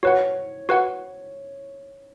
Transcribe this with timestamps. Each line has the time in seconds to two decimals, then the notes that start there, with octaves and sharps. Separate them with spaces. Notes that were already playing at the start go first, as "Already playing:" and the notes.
0.03 F#4 B4 C#5 F#5
0.69 F#4 B4 F#5